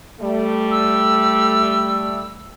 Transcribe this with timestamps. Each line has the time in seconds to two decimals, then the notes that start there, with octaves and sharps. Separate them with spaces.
0.21 G3 A3
0.71 E6